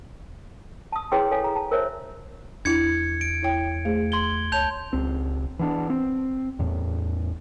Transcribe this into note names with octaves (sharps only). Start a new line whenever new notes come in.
A5 D#6
E4 G#4 B4 C#5 G5 C6
A4 C#5 F5 G#5
A#5
A5
A#4 C5 C#5 E5
E2 D4 E4 G#6 C#7
D7
E4 C#5 G5
A3 G#4 C5
C6 G#6 G7
C#2 C#5 A5 G6 F7
C#2 C4
E3 B3 D4
C4
E2 A2